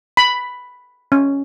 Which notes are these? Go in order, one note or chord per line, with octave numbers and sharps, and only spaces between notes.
B5
C#4